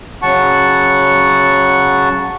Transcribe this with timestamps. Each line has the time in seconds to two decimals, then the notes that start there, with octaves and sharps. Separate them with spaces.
0.22 C#3 F#3 F#5 A5 C#6